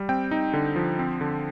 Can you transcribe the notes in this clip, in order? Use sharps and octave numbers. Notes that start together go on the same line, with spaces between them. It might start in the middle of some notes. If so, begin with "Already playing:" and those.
Already playing: G3
C4 G5
D#4
D3
F3
C4
D3